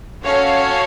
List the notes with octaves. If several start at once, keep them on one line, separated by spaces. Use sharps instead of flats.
C#4 F#4 A4 C#5 F5